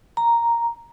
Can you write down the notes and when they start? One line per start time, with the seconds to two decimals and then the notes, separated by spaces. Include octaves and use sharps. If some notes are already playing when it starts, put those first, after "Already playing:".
0.17 A#5